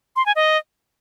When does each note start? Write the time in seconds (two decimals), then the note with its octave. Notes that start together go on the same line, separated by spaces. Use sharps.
0.16 C6
0.26 G#5
0.36 D#5